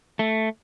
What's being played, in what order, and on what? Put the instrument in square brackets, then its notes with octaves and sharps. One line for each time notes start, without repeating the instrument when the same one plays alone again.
[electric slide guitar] A3